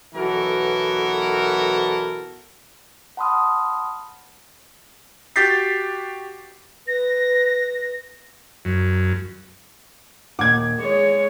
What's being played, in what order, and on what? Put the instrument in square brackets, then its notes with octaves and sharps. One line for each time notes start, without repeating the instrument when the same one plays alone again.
[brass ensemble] B1 E3 B3 F#4 A4 A#4
[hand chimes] F#5 A5 B5 C6 D#6 F6
[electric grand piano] F#4 G4 G6 A6 B6 C7
[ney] B4 [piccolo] A#6
[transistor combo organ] F#2
[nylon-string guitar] D#2 A#2 F#5 [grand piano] D6 G#6
[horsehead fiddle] G#3 C#5 [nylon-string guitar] G#4